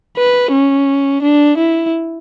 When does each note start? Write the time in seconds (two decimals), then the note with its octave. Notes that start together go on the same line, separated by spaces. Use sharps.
0.17 B4
0.52 C#4
1.22 D4
1.57 E4